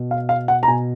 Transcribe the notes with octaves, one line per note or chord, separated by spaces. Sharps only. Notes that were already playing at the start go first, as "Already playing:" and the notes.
Already playing: B2
F5
F5
F#5
A#5
B2 G#5